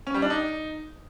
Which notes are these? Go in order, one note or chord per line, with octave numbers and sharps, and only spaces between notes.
C#4
G3
D4
D#4